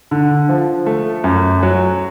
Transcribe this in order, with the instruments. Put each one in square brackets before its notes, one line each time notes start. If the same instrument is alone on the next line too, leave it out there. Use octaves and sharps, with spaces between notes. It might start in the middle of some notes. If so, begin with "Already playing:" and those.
[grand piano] D3
F3
A3
F#2
F#3